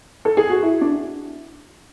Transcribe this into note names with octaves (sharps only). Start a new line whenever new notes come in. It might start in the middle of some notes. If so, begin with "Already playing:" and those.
A4
G#4
F#4
E4
D4